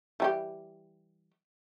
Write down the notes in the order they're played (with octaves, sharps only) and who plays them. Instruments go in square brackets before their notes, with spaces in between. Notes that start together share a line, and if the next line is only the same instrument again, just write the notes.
[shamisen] E3 G3 G4